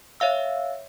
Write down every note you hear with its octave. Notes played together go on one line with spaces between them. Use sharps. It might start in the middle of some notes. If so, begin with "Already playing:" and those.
C#5 E5 F5 E6